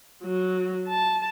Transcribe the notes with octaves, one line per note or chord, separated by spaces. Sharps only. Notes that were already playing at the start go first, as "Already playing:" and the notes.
F#3
A5